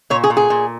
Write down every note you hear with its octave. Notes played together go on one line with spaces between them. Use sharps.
A#2 C#5
G#4
A#2
G#4
A#2